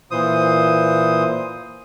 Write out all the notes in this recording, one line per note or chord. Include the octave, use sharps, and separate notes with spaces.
A#2 E3 C5 D#6